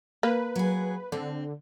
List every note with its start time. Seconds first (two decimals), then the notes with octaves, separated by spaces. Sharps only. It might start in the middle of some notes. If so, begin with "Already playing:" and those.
0.23 A#3 B4
0.56 F#3 G#4
1.12 D3 C4